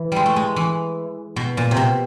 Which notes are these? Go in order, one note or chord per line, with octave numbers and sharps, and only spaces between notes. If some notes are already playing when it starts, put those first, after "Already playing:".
Already playing: E3
G3 G#3
A3
G#3
E3
B2
A#2
C3
B2